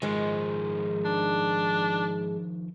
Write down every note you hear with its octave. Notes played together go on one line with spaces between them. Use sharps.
G#2 D#3 F3 G#3
D4